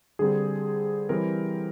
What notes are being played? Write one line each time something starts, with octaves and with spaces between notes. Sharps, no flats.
D3 G3 C4 G#4
E3 G3 C4 A#4